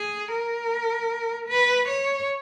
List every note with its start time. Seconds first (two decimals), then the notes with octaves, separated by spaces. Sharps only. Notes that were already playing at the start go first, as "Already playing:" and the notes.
Already playing: G#4
0.31 A#4
1.49 B4
1.88 C#5